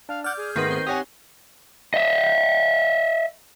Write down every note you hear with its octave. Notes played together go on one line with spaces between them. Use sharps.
D4 F5
D5 F#5 D6 F6 G6
G#4
G#1 D#3 A3 B3 C4 D#4 B4
C5
G4 C#5 F#5 G#5 D#6 A#6
D#5 E5